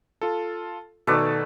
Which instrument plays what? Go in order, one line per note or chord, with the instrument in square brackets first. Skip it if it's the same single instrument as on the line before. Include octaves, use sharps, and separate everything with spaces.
[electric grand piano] F4 A4
[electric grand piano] B2 D#3 [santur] A3 B4 D5